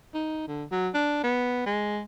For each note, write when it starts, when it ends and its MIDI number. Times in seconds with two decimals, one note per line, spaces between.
0.14 0.47 63
0.48 0.64 50
0.71 0.88 54
0.94 1.19 62
1.24 1.66 59
1.66 2.01 56